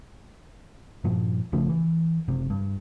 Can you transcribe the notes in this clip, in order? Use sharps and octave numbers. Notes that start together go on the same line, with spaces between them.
G2 A#2 F3
A#1 C#3 F3 A3
E3
F#1 C3
G2